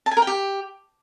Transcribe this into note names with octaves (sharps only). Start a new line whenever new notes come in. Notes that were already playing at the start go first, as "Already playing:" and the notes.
A5
G#5
A#4
G5
G4